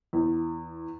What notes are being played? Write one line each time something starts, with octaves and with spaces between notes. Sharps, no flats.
E2